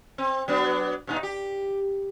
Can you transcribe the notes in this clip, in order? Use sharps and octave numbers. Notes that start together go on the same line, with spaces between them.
C4
F#3 B3 D4
G2 A#2 D#4
G4